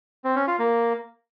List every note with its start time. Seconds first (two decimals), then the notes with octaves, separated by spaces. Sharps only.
0.24 C4
0.36 C#4
0.47 F4
0.59 A#3